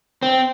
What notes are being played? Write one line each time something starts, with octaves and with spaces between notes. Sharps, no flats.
C4